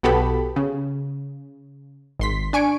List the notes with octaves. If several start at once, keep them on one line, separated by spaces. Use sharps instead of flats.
B1 B3 F#4 G4 A4 B5
C#3
G#1 C6 B6
D4 G#5 C#6 D7